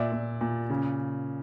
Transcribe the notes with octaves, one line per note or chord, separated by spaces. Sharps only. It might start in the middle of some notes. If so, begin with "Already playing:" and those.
Already playing: A#2 D5 E5
A#2
A#2
C#3